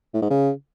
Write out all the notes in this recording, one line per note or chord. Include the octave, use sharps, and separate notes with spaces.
A2
G#2
C#3